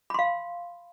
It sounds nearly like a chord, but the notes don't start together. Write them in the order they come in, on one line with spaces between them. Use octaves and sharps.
B5 C6 F5